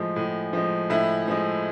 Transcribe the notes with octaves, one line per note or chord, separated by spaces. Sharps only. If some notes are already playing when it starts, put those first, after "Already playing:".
Already playing: A2 F3 G#3
A2
F3 G#3
A2 E4
F3 G#3